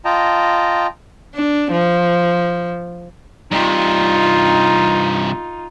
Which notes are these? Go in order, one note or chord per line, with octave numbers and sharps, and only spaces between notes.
F4 D#5 G5 A5 A#5
D4
F3
G2 C3 D#4 F4